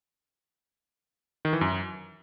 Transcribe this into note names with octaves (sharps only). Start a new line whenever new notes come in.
D#3
E3
F#2